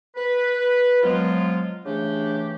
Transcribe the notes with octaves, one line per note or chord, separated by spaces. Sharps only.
B4
F3 F#3 G#3 B3 F4
C#3 E3 A3 D4 G4